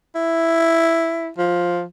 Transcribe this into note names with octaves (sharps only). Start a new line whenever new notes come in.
E4
F3